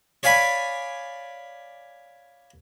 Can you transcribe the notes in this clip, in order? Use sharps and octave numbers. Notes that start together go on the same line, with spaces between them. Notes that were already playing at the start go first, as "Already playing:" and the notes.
C#5 D5 F5 G#5 B5